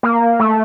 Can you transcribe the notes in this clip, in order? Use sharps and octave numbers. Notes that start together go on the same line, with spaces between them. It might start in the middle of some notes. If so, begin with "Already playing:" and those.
A#3
A3